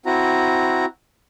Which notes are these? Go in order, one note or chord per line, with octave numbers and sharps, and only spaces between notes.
C4 E4 F#4 A#5